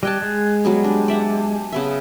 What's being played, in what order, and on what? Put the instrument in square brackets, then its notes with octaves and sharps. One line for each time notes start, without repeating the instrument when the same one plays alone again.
[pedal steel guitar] G3 [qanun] D#5 G5 A5 [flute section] F#6 G#6
[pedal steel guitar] G#3
[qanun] F#3 G3 B3 [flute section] F#5
[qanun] D4 [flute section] G4 G#5 A5
[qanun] D5 E5 F#5
C#3 B3 E5